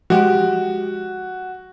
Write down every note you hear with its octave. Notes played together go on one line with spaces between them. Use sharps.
F3 G#3 F#4 G4